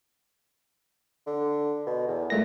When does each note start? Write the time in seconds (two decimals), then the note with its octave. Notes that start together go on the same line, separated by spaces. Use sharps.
1.27 D3
1.87 B2
2.08 E2
2.30 A#2 G#3 A3 A#6